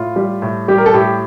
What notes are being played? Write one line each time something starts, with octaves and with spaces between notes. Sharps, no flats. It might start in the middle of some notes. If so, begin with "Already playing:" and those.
Already playing: A2 F4
G3
A2
G3 G4
A#4
A4
A2 G4